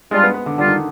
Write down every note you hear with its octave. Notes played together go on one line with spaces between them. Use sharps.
G3 G#3 D4 F4
B3
B3
D3
D3 G3 D4 F4
D#3